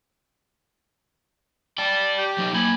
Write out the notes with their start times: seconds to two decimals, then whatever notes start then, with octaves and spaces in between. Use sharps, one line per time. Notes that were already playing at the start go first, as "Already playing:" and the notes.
1.78 D5 G5 A5
2.17 G4
2.38 F#3 D#4
2.54 A#3 G#5 B5